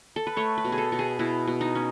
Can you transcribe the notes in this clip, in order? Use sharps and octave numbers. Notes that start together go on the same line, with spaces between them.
A4
B4
A3 C#5
B4
B2
G#4
A4
B2
G#4
B2 E4
B2
D#4
C#4